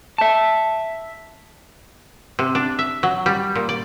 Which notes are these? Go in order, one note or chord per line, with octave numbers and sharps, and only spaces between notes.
E5 A5
C3
D4
E5
F#3
G3
A#2
D5